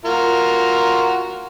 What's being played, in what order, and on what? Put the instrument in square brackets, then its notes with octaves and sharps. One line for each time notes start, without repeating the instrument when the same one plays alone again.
[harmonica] F4 F#4 A#4